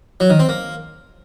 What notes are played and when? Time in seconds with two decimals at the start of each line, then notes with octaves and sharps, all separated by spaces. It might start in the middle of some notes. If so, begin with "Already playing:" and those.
0.20 F#3
0.30 D#3
0.39 C4
0.49 A#3